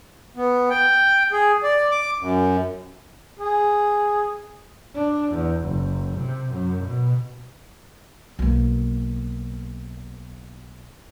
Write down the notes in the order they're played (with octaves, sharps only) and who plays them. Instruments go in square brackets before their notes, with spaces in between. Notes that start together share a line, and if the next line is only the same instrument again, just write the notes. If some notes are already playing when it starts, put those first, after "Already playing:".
[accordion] B3
G5
G#4
D5
D6
F#2
[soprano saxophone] G#4
[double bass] D4
E2
F#1
C3
F#2
B2
[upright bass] B1 A#3